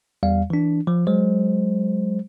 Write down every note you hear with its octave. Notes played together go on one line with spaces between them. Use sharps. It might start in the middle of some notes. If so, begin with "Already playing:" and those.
E2 G3 F5
E3 D4
F3
F#3 G#3 C5